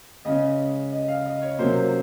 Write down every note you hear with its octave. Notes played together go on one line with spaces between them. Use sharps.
C#3 G#3 C#4 D#5
D#5
F5
D#5
C#5
C3 F#3 A#3 C#4 C5